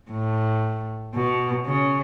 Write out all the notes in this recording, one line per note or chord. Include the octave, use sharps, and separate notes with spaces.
A2
B2
C#3